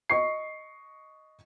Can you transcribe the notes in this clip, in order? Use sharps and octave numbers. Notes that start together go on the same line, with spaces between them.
D#5 C#6 C7